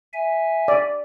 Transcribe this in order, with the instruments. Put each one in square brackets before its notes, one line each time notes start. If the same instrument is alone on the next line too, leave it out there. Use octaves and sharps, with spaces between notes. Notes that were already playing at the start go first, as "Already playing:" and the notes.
[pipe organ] E5 G#5
[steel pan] D5